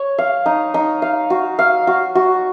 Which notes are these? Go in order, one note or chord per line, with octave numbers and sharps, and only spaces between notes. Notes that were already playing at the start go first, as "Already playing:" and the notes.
Already playing: C#5
F5
D#4
D#4
F5
F#4
F5
F#4
F#4